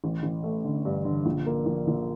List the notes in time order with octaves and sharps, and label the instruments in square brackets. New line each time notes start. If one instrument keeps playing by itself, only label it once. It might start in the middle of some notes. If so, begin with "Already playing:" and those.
[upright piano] A1
A1
A3
D3
G2
D3
A#1
A#3
A#1
A#1